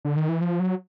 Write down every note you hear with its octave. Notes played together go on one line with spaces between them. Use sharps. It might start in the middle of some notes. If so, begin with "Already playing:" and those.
D3
D#3
E3
F3
F#3